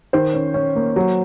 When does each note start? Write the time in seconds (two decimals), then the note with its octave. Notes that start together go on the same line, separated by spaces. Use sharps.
0.13 D#3 C5
0.33 C#4
0.54 C#4
0.75 A#3
0.96 F#3